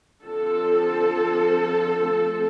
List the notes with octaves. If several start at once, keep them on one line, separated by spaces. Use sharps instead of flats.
D3 F3 C4 A4
F3 A3 C4